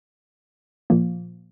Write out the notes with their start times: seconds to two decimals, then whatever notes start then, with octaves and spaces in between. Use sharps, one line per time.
0.90 A#2 F3 A#3